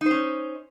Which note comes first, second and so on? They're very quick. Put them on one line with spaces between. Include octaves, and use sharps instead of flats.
D#4 C5 C#4